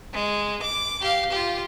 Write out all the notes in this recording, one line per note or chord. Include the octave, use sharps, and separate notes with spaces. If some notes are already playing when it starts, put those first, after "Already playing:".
G#3
D6
G4 F5
F4 G4